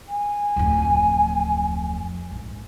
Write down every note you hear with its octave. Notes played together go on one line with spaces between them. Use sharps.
G#5
D1 F2
A#1 G#2